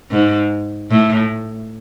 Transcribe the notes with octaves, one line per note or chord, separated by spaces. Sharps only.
G#2
A2